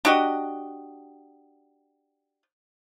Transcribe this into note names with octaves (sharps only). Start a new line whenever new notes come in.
D4 F#4 G4 D#5